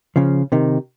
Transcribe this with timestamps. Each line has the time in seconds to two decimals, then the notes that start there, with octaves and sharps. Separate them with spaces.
0.16 C#3 F3
0.52 C3 D#3